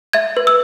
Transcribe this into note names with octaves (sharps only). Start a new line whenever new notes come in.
E5 G#6
B4
E6